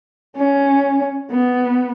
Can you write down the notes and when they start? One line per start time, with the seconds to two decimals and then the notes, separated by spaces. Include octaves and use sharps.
0.37 C#4
1.31 B3